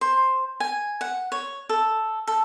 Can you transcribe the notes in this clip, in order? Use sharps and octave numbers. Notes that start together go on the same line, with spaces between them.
C5
G#5
F#5
C#5
A4
A4